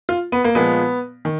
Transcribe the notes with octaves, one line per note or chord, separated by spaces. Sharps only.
F4
B3
A#3
A#2 F3 G#3 B3
D#3